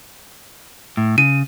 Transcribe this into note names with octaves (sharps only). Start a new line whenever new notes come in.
A2
C#3 D#7